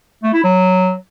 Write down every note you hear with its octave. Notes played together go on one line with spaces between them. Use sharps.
A3
E4
F#3